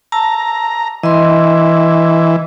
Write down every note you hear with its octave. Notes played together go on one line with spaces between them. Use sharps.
A5 A#5 E6
E3 D#5 C6